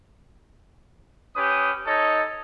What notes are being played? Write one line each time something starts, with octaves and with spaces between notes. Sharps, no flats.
C#4 G4 B4 D#6
D#4 A4 C#5 D#5